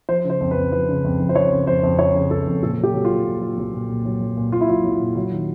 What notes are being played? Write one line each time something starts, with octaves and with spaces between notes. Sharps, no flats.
F3 C5
C#3
C5
F2
B4
F2
F3 B4
C#3
F2
F2
C5
F3 C#5
C#3
F2 C5
F2
F3 C#5
C#3
F2 A4
F2
A#2 A4
F#3
G4
F#3
F4
A#2
A#2
F#3
F#3
A#2
A#2
F#3
F#3
A#2
A#2 F4
E4
F#3 F4
F#3
A#2
F#3
D#3